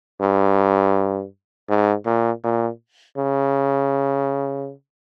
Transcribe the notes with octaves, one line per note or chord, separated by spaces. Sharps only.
G2
G#2
A#2
A#2
C#3